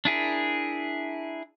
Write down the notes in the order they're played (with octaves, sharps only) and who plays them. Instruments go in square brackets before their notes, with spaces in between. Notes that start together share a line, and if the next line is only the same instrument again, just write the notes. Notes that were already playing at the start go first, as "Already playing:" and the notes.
[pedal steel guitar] D4 E4 G#4 A#4